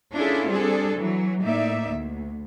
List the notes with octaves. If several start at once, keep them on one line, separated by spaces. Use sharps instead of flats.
C#4 D4 E4 F4 G#4 A4
G3 C4 D4 G#4 A4
E3 F#3
A2 A#3 D#4 D5 E5
D2